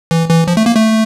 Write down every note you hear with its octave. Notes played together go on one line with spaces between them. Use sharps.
E3
E3
F3
A3
A#3
A3